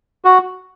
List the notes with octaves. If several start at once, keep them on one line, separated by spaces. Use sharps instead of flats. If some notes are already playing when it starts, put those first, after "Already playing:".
F#4